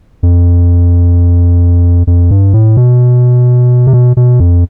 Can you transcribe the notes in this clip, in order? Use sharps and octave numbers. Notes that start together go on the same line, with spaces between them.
F2
F2
G2
A2
B2
C3
B2
B2
F2